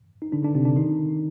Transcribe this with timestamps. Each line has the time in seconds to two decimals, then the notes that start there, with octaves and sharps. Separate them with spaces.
0.22 D#4
0.32 D3 D4
0.43 D3 D4
0.55 C3 C4
0.65 D3 D4
0.76 D#3 D#4